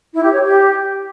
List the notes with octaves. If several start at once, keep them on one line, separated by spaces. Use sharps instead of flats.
E4
G4
C#5
G4